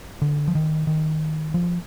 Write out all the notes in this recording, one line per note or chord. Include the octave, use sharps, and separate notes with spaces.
D3
F3
D#3
D#3
F3